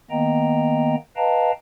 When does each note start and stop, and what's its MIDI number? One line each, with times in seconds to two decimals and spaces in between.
0.11 0.95 51
0.11 0.95 58
0.11 0.95 59
0.11 0.95 75
0.11 0.95 79
0.11 0.95 82
1.17 1.52 71
1.17 1.52 75
1.17 1.52 77
1.17 1.52 79
1.17 1.52 81
1.17 1.52 82